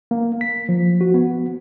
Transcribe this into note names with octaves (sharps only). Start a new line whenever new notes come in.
A#3
B6
F3
F#4
B3